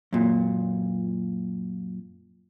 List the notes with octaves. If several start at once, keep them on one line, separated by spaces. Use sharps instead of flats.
F#2 A#2